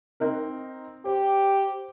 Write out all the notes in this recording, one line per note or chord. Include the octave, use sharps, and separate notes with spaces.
C4 D#4 A#4
G4 C5